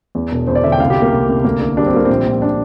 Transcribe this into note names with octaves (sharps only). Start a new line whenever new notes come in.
E2
E1
E2 C5
D5
D3 E5
G5
C2 F5
G4
C3
A#3
C2
C2
D2 A#3
D3
G3 D4
C4
G3 A#3
A#1 C4
A#1
D4